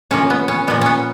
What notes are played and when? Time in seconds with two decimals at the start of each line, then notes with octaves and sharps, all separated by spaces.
0.11 C#3 F3 A#3 C#4
0.30 B3
0.48 C#4
0.67 A#2 F3 A#3 B3
0.81 B3 C#4